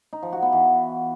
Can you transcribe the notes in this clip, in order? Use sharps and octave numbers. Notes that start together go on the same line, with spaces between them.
D#4
F3
F#4
B3
E3